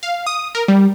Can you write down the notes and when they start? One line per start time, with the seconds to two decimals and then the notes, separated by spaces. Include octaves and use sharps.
0.03 F5
0.26 D#6
0.55 A#4
0.68 G3